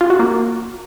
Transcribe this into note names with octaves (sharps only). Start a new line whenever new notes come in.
F4
F#4
A#3